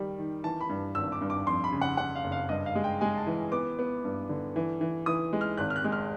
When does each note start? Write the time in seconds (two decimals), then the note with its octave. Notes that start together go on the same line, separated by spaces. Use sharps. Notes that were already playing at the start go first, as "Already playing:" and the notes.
Already playing: D#3 G3
0.18 D#3
0.44 E3 A5
0.61 B5
0.69 G2
0.95 G#1 E6
1.12 D6
1.21 G2
1.30 D6
1.47 F2 C6
1.64 B5
1.72 C#3
1.81 F#5
1.97 C#3 F#5
2.15 F5
2.24 F#1
2.32 F5
2.49 G2 D#5
2.66 F5
2.75 G#3
2.84 G5
3.01 G#3 G#5
3.18 A5
3.27 E3
3.52 B3 D6
3.79 B3
4.04 G2
4.29 D3
4.56 E3
4.81 E3
5.06 E3 D#6
5.33 G#3
5.41 F6
5.57 G#1 F#6
5.70 F6
5.76 F#6
5.84 G#3
5.92 F6